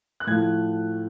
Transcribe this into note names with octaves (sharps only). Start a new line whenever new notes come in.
F#6
A2 F3 A3 G#6